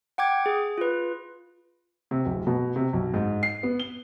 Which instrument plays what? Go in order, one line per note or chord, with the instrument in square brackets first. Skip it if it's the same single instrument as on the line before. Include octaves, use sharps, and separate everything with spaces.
[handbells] F#5 G5 D6 G#6
G#4
F4 B4
[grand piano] C3
D1
B2
C3
B1
G#2
C7
B3
G7